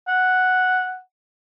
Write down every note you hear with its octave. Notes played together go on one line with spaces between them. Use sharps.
F#5